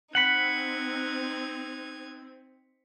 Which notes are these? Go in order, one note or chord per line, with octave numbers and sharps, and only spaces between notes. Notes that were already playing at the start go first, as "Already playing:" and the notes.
C4 D#4 F#5 B5 G#6 B6 C#7 F#7